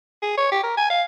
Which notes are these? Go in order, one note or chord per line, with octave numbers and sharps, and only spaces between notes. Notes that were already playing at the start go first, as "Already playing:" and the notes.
G#4
C#5
G4
A#4
G#5
F5